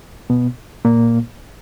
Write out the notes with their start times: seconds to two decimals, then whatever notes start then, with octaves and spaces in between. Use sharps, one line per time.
0.30 B2 B3
0.85 A#2 A#3